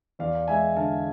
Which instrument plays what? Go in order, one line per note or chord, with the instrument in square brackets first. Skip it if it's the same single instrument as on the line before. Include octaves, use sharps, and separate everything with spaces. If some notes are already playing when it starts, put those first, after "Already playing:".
[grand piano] E2 D5 F5
G#3 E5 G#5
D3 F5 A5